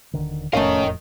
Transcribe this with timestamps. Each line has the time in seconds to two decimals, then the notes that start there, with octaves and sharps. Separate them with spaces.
0.13 D#1 D3 D#3
0.53 E1 F2 A2 A3 C#4 A#4 D#5 F5